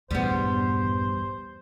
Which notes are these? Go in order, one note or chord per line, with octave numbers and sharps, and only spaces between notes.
A#1 E2 G2 G3 B3 C5